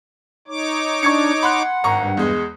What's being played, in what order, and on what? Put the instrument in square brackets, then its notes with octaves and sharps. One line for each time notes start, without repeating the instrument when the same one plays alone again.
[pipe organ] D#4 C#5 D6
[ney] D4 [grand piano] C#6 G#6 C#7
[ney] F#5 [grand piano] B5 C6 F#6
[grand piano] G#1 A#5 C#6 [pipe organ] G2
[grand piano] E2 G#3